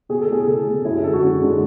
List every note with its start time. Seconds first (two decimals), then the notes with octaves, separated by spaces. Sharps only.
0.09 B2 G#4
0.21 A4
0.28 A3 G#4
0.47 B2 A4
0.66 A3
0.85 F#2 E4
0.95 G#4
1.04 D3 G#3 A4
1.13 F#4
1.23 F#2
1.42 D3 G#3